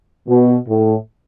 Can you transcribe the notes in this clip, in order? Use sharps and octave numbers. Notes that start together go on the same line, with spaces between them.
B2
A2